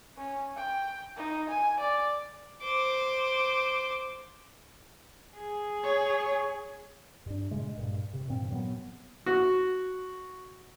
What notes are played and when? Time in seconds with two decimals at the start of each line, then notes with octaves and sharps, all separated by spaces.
0.17 C#4
0.57 G5
1.17 D#4
1.49 G#5
1.80 D5
2.63 C5 D6
5.37 G#4
5.83 C#5
7.26 G2 D4
7.51 A#2 C#3 G#3
7.77 G2 A#2
8.13 C3
8.27 G2 A#2 E3 C4
8.50 A#2 F#3 A3 B3
9.26 F#4